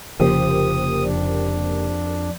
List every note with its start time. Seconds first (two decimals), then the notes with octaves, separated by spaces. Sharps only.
0.19 F1 C#3 F3 A#3 G4 C5 D#6
1.05 F2 D4